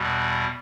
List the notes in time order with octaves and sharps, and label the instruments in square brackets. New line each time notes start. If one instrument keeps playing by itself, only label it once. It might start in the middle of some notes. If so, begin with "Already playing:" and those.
Already playing: [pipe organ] E2 B2 G3